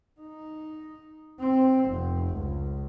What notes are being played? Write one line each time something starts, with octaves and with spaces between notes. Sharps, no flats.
D#4
C4
F1
C#2